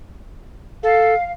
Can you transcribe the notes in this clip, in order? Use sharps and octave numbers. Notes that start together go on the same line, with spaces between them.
A4 F5